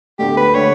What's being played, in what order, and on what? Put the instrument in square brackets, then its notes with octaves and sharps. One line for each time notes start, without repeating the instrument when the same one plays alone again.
[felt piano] D2 D3 A3 [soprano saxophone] G4
[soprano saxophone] B4
[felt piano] D3 A3 [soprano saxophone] C#5